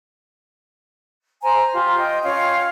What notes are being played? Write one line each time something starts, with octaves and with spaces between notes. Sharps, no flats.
C5 G#5 A#5
F4 G4
D#5 G5
C#4 F4 C#5 F5